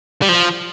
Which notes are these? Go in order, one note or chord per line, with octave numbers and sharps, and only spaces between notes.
G3
F3